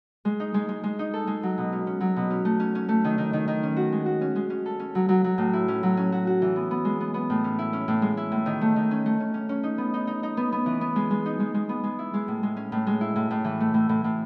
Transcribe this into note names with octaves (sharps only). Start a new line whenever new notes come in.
G#3
D#4
G#3
G#3
G#3
D#4
A4
G#3
F#3
B2
C#4
C#4
F#3
B2
C#4
A3
C#4
C#4
A3
D#3
D#3
D#3
D#3
C#4
F#4
G#3
F#4
C#4
G#3
C#4
A4
C#4
F#3
F#3
F#3
A2
E4
C#4
F#3
C#4
F#4
F#4
E3
B3
B3
G#3
B3
B3
A2
C#4
E4
C#4
A2
G#3
E4
A2
D#3
A3
D#3
C#4
A3
C#4
C#4
C#4
D#4
B3
D#4
D#4
D#4
B3
B3
E3
B3
G#3
G#3
D#4
G#3
G#3
B3
G#3
E4
G#3
A2
G#3
C#4
A2
G#3
E4
A2
A2
E3
A3
A2
A2
A2